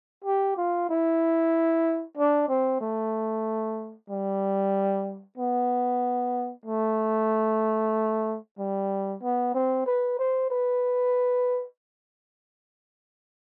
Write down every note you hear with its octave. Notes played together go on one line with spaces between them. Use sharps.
G4
F4
E4
D4
C4
A3
G3
B3
A3
G3
B3
C4
B4
C5
B4